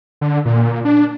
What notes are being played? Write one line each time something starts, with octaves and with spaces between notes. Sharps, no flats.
D3
A#2
D4